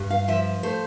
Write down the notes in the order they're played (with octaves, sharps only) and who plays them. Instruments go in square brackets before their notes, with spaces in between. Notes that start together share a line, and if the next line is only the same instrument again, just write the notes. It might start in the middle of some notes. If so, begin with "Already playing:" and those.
Already playing: [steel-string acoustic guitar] G2
F5
F3 E5
A3 C5